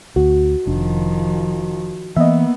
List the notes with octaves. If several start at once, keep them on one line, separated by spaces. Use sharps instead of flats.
D2 F#4
F1 D#3 F3 D4
E3 A#3 B3 D#5 E5